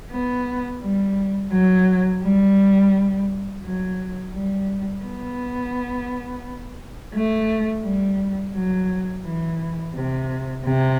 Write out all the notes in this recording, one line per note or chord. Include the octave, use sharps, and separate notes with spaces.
B3
G3
F#3
G3
F#3
G3
B3
A3
G3
F#3
E3
C3
C3